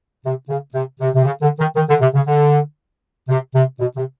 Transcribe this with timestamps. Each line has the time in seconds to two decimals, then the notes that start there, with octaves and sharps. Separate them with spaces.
0.24 C3
0.49 C#3
0.74 C3
1.00 C3
1.15 C3
1.25 C#3
1.42 D3
1.59 D#3
1.76 D#3
1.89 D3
2.01 C3
2.14 C#3
2.27 D3
3.29 C3
3.54 C3
3.80 B2
3.96 C3